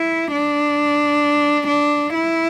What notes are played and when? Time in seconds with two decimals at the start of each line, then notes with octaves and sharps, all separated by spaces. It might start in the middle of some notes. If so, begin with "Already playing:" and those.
Already playing: E4
0.32 D4
1.67 D4
2.14 E4